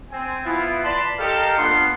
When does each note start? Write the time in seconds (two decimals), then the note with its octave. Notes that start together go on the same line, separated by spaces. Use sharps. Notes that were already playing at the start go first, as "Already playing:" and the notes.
0.11 C4 G#5
0.45 B3 E4 F4
0.84 B4 D5 A5 B5 C6
1.18 D#4 G4 A4 A#4 D#5 F5
1.58 A#3 B3 D4 F4 F#5 C6